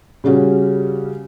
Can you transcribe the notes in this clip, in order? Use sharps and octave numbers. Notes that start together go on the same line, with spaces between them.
C#3 G3 C#4 F#4